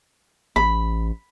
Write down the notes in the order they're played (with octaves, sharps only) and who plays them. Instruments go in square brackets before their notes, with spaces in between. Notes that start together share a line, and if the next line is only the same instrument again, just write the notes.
[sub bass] A1 [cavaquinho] B5